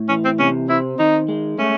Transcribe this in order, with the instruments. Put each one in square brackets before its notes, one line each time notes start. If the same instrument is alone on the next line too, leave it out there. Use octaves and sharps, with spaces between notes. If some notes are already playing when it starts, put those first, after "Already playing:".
Already playing: [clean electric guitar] A2
[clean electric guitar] E3 [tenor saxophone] C#4
[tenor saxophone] C4
[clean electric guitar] C3 [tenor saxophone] C#4
[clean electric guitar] C4 [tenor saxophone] E4
[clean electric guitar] D#3 [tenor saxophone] D#4
[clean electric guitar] G#3
[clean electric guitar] A3 [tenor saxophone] C#4